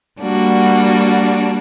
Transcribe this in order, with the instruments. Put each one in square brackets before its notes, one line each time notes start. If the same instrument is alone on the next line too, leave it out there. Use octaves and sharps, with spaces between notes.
[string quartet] G3 A#3 D4 F#4